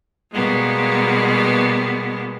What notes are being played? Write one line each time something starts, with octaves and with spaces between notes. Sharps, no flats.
B2 G3 G#3 A#3 B3